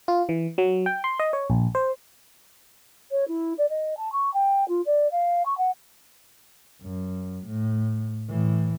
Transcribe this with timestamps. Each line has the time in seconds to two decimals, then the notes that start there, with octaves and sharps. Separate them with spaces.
0.08 F4
0.29 E3
0.58 F#3
0.86 G5
1.04 C6
1.19 D#5
1.33 C#5
1.50 A#1
1.75 C5
3.11 C#5
3.28 E4
3.58 D5
3.70 D#5
3.97 A5
4.13 C#6
4.34 G5
4.69 F4
4.86 D5
5.12 F5
5.46 C#6
5.58 F#5
6.82 F#2
7.47 A2
8.29 A2 E3